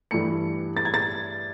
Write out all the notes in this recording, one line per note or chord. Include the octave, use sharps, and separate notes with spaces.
G2 E3 A3 C#7
A6
G#6
A6